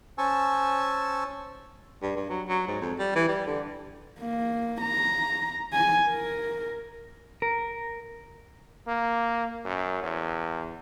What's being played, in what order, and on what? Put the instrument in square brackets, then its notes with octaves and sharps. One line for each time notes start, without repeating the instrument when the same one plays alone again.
[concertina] C#4 C5 G#5 A5 C#6 E6
[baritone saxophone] G2
G2
F#3
F#3
G#2
F2
G3
E3
G3
D3
[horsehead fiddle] A#3
A#5
G#5
A#4
[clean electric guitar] A#4
[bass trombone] A#3
F#2
E2